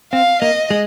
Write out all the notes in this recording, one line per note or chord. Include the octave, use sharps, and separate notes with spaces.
C4 F5
A#3 D#5
G#3